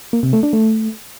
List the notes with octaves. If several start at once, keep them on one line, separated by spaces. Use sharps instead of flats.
A#3
C3
A3
D4
A3